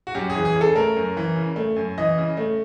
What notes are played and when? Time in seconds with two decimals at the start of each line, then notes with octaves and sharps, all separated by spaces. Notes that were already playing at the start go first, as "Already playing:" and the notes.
0.07 F#4
0.14 F#2 G4
0.30 G#4
0.35 E3
0.45 G#4
0.56 C#3
0.61 A4
0.75 A3 A#4
0.96 F#2
1.17 E3
1.36 C#3
1.56 A3
1.76 F#2
1.98 E3 D#5
2.18 C#3
2.37 A3